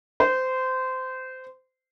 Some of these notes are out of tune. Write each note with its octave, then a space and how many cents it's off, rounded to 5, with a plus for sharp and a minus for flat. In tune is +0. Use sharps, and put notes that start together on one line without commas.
C5 -20